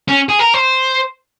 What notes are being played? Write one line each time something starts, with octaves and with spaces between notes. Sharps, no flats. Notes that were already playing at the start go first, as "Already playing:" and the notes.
C#4
G#4
A#4
C5